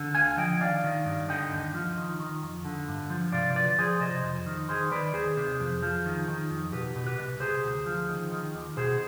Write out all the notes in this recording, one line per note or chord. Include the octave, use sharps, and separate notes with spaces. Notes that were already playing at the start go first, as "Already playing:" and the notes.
Already playing: D3
D2 F5 G#5
F3 D#5 G5
D#3 D5 F5
D#3
G2
D3 D#5 G5
D#2
F3
D#3
D#3
F2
D3
G2
F3
C3 D5 F5
D2 B4 D5
F3 G#4 C5
C3 C5 D#5
F2
D#3
D#3 G#4 C5
D#3 B4 D5
D#2 G#4 C5
C3
F2
F3
D#3
D#3
F2
B2 G4 B4
B2
G4 B4
C2
C3 G#4 C5
D2
F3
D#3
D#3
D#2
B2 G#4 C5